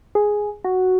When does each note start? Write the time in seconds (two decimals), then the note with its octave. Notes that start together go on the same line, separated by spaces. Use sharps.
0.15 G#4
0.64 F#4